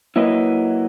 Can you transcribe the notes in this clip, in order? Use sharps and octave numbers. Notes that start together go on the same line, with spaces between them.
F#3 A#3 E4 B4 D#5